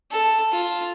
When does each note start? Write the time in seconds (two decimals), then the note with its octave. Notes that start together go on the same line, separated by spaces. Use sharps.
0.11 A4
0.53 F4